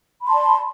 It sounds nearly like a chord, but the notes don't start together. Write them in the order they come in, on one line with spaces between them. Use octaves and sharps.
B5 C6 A5 D5